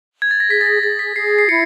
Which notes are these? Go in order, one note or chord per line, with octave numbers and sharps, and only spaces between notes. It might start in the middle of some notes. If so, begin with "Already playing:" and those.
G#6
A6
A#6
G#4 B6
A6
A#6
G#4 A6
B6
G#4 C7
C7
E4 C#7